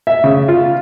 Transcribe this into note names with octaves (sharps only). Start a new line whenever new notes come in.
E5
C#3
F4